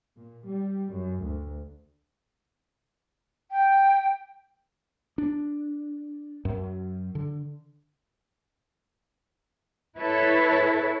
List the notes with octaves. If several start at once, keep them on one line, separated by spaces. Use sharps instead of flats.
A#2
G3
F#2
D2
G5
D4
F#2
D3
E4 A4 B4 C#5